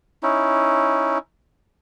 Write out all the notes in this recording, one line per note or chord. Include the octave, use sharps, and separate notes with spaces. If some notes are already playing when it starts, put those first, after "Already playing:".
C#4 D#4 E4